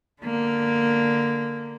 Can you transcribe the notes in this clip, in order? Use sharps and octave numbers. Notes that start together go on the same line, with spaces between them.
D3 A#3